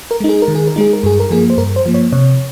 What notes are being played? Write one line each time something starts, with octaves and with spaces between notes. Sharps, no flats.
A#4
G#3 D#4
G#4
A#4
D#3
G#4
A#4
G#3 D#4 G#4
A#4
G2 G#4
A#4
F3 A#3 G#4
C5
G2 A#4
C5
F3 A#3
C#5
C3 C#5